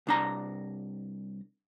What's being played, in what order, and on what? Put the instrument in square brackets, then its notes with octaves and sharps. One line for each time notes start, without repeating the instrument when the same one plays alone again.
[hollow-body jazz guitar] C2 D4 A#5